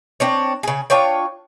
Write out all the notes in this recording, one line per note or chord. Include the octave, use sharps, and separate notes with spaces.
C4 D4 C#5
C#3 G#4
D4 F4 C#5 G5